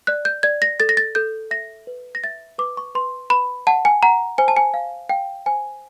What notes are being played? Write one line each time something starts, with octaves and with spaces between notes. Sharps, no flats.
D5 F#6
G6
D5 G#6
A#6
A4 A6
A#6
A6
A4 G6
E5 A#6
B4
A#6
E5 A6
B4 D6
C#6
B4 C6
B4 B5
F#5 A5
G#5
F#5 A#5
C5 G#5
A5
G#5
F5
F5 G5
C5 G#5